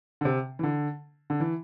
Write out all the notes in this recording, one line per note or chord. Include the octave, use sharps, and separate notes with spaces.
D3
C3
E3
D3
D3
E3